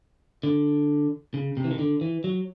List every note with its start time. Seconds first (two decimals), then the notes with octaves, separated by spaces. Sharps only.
0.43 D3
1.34 C#3
1.57 C3
1.64 E3
1.71 D#3
1.79 D3
2.01 E3
2.24 F#3